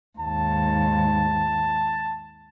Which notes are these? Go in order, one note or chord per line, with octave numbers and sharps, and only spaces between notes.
D#2 G#2 A5